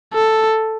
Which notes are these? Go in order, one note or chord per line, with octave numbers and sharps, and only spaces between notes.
A4